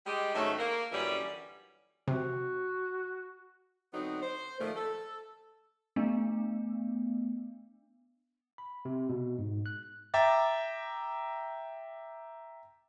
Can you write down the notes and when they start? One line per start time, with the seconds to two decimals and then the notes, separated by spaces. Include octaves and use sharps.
0.06 G3 G#3 G4
0.35 G#2 D#3 F#3 A3 C#4 D4
0.58 A#3
0.92 F#2 A#2 D3 E3 G3 C#4
2.08 C3 F#4
3.93 D3 F#3 B3 C4 D#4 F#5
4.22 C5
4.60 A#2 D#3 F3 A3
4.75 A4
5.96 A3 B3 D4
8.58 B5
8.85 C3
9.09 B2
9.38 G#2
9.66 F#6
10.14 E5 G5 A#5 D6 A6